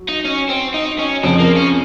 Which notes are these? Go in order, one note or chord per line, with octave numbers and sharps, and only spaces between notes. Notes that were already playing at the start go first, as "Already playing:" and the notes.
Already playing: F#3
D#4
C#4
C4
D#4
C#4
F2 C#3 F3 C4
A#3
C#4